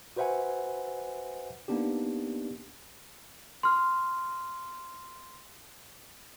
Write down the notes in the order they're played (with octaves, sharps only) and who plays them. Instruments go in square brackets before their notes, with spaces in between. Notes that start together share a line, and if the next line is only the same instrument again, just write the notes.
[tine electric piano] F#4 B4 C5 E5 F#5 G#5
A#3 B3 D4 D#4 G4
[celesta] C6 F6